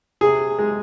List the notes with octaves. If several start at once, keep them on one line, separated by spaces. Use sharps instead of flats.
C3 G#4
G#3